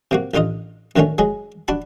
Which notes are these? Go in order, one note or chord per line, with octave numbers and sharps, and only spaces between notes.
C3 A#3 F#4
A1 D3 D#4 F4 D#5
F#2 D3 D#3 F#3 A3 C#4
F#3 G#3 G#4
D4 F#4 A5 B5